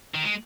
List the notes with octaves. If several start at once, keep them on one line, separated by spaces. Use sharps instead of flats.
D#3
G#3